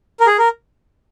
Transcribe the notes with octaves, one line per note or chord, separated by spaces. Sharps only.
A#4
G#4
A#4